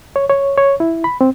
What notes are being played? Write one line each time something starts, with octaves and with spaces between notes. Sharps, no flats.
C#5
C#5
C#5
E4
B5
C4